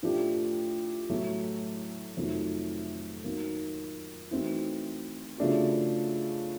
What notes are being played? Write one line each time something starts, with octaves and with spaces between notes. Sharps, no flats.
A2 F3 A3 D4 G4
A2 F#3 A3
F2 C3 D#3 F#3 A3
D#3 F#3 A#3
E3 A3 C4 D#4 F#4
C#3 F3 A3 D4 F#4